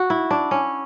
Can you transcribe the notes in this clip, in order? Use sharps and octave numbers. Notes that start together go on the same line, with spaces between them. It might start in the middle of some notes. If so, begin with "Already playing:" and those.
Already playing: F#4
E4
D4
C#4